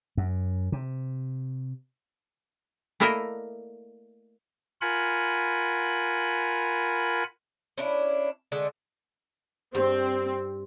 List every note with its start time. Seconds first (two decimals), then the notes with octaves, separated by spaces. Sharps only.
0.17 F#2
0.72 C3
3.00 A3 A#3 E4 A#4 D5 D#5
4.81 F4 A#4 F#5 G#5 B5
7.78 C#4 D4 E4
8.52 D3 G#3 A3
9.75 G2 C4